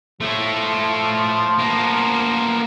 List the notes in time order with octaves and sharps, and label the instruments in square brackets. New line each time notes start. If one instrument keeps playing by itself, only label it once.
[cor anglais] F3 [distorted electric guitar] A3 C#5
[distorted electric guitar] A#3 B3